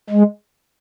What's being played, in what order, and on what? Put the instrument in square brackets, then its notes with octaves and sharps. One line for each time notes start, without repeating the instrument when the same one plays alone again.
[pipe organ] G#3